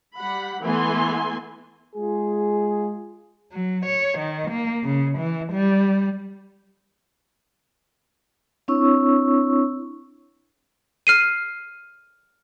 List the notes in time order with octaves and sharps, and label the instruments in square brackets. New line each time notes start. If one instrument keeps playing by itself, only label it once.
[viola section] G3 F#5 B5
E3 A3 B3 G#5 C6
[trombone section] G#3 F4 G#4
[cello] F#3
C#5
D#3
A#3
C#3
E3
G3
[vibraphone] C4 D4 E4 C#5 C#6 E6
[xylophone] F6 C7 D#7